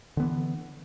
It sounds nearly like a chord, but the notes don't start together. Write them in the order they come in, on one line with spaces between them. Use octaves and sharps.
D3 B3 E3